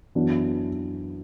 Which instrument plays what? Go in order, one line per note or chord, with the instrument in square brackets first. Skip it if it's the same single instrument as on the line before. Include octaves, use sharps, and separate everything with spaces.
[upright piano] F#2 E3 B3 D4